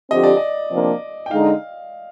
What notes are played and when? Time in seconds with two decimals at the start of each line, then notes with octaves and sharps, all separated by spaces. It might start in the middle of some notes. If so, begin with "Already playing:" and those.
0.10 D3 F3 C4 G4 D#5
0.24 D5
0.37 D#5
0.71 C3 F3 A#3 D4
1.26 G5
1.31 D3 G#3 D#4 F5